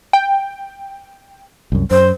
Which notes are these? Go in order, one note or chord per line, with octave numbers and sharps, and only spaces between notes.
G5
C2 F#2
F#2 C5